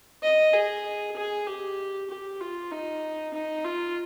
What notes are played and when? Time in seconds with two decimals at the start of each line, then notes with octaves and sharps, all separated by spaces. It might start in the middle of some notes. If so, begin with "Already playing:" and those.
0.23 D#5
0.54 G#4
1.16 G#4
1.47 G4
2.10 G4
2.41 F4
2.71 D#4
3.34 D#4
3.65 F4